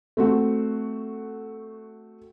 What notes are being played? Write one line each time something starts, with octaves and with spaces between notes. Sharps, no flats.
A3 C4 F#4